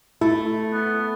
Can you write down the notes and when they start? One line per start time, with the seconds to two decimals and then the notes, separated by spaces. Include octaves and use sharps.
0.21 A3 E4
0.73 B3